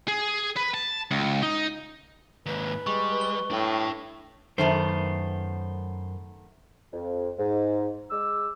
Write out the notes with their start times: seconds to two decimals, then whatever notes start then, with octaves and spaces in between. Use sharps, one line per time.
0.08 G#4
0.57 B4
0.74 A5
1.11 C#2
1.43 D#4
2.46 D#2 G#2 B4
2.87 G3 G#3 C#6
3.21 G7
3.51 A2 D4 G5
4.58 F#2 D#3 A3 B3 C5
6.93 F2
7.38 G#2
8.11 G#3 D6 E6